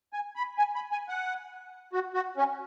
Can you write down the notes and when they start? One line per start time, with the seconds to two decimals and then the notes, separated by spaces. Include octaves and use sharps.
0.13 G#5
0.36 B5
0.58 G#5
0.75 B5
0.92 G#5
1.09 F#5
1.93 F#4
2.14 F#4
2.37 C#4